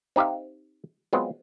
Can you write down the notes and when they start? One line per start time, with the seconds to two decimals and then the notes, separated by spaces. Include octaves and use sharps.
0.16 C4 D#4 G4 E5 F5
1.13 F#3 G#3 B3 C4 F4